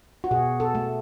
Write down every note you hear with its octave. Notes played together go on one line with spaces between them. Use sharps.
F#4
B2 G#4
A4
A3